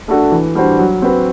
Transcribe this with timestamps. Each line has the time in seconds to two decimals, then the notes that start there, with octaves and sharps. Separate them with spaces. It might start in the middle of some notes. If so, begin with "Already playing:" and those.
0.08 A3 D4 F#4 A4
0.32 E3
0.55 G3 D4 F#4 C5
0.79 F#3
1.02 C4 F#4 B4